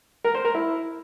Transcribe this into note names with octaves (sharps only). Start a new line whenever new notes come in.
A#4
C5
A#4
E4